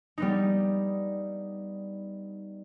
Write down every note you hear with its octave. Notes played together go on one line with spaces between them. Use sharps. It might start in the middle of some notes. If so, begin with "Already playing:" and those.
G3 B3 D#4